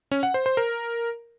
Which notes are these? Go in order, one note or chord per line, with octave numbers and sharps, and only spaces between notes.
C#4
F#5
C5
C5
A#4